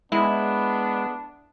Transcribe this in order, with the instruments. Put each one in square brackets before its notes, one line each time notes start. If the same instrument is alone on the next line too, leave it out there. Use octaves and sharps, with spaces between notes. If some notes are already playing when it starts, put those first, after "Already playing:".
[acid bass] G#3 [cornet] B3 [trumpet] D4 [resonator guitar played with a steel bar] E4